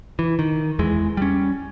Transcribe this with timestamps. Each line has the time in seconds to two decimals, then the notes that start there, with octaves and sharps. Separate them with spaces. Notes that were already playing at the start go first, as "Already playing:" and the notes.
0.19 E3
0.39 D#3
0.79 E2 E3 G#3
1.17 G3 C#4